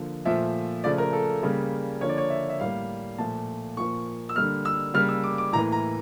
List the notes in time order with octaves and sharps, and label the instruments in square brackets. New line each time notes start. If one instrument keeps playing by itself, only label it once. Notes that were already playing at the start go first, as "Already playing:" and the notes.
Already playing: [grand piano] D3 F3 A#3
A#2 F3 A3 E5
C#3 F3 A3 D5
A#4
A4
C#3 G3 A#3
D3 F3 A#3 C#5
D5
C#5
E5
E5
A2 G3 A#3 F5
A#2 F3 A3 A5
A#2 F3 A#3 C#6
E6
D3 G3 A#3 F6
E6
C#3 G3 A#3 F6
E6
D6
D6
A2 E3 A#3 A#5
A#5